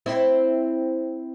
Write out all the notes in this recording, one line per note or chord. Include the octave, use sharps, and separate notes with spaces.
C4 E4 C#5